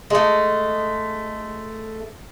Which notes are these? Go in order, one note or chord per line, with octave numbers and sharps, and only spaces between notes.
G#3 A3